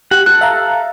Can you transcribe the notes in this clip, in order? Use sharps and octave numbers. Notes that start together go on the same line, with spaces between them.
G4 F#5
A4 F#6
E5 F5 A#5